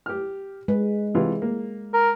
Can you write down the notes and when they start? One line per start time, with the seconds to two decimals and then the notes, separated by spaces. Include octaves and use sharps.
0.06 G4 F6
0.68 G#3 B4
1.14 C3 E3 F4
1.42 A#3
1.94 A#4